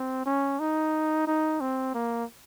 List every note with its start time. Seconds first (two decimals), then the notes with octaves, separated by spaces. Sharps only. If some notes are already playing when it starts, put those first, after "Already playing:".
Already playing: C4
0.26 C#4
0.60 D#4
1.27 D#4
1.61 C4
1.95 A#3